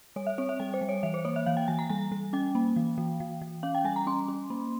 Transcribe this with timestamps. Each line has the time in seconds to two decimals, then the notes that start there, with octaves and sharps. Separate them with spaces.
0.16 G3 C#5
0.27 E5
0.38 C4 C#5
0.49 E5
0.60 G3 G5
0.74 C5
0.81 G3
0.89 C#5
1.03 E3 E5
1.14 C5
1.25 A#3 C#5
1.36 E5
1.46 E3 F5
1.57 G5
1.68 E3 G#5
1.79 A#5
1.89 G3 G#5
2.12 G3
2.33 C#4 G5
2.55 A#3
2.76 E3
2.98 E3
3.20 E3
3.41 E3
3.63 C#4 F5
3.75 G5
3.84 G3 G#5
3.96 A#5
4.07 C#4 C6
4.28 C#4
4.50 A#3